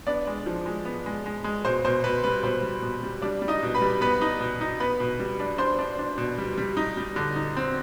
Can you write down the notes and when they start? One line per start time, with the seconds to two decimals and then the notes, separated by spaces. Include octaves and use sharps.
0.07 B3 D4 D5
0.27 G#3
0.46 F3
0.66 G#3
0.85 B3
1.06 G#3
1.26 G#3
1.44 G#3
1.65 B2 C5
1.85 B2 C5
2.03 B2 B4
2.24 G3 B4
2.43 B2 C5
2.63 G3
2.82 B2
3.03 G3
3.22 G3 D4 D5
3.42 G3
3.48 D#4 D#5
3.62 B2
3.75 B4 B5
3.82 G3
4.01 B3 B4 B5
4.22 D#4
4.41 B2
4.61 D#4
4.80 B3 B4 B5
5.00 B2
5.20 G3
5.40 D4
5.58 D4 C5 C6
5.79 D4
5.99 D4
6.18 B2
6.38 G3
6.58 G3
6.77 D#4
6.97 G3
7.16 D3
7.36 D#4
7.57 C4